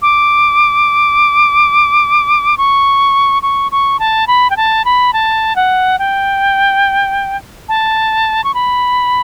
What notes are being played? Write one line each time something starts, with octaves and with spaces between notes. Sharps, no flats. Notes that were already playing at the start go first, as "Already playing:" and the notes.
D6
C#6
C#6
C#6
A5
B5
G5
A5
B5
A5
F#5
G5
A5
C#6
B5